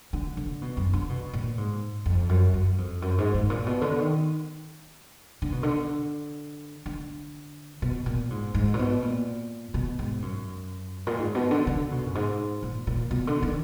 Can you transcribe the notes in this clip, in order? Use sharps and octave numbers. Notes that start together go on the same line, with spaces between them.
D3
D3
B2
F#2
D3
B2
A#2
G#2
F2
F#2
F#2
F2
F#2
G#2
G#2
A#2
B2
D3
D#3
D3
B2
D3
D3
B2
A#2
G#2
G#2
A#2
B2
A#2
B2
G#2
F#2
A#2
G#2
B2
D3
D3
B2
F#2
G#2
A#2
A#2
B2
D3
D#3